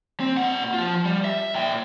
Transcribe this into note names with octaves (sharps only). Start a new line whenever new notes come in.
C4
A#2 F#5
F3 F4
G3
E5
A#2 G5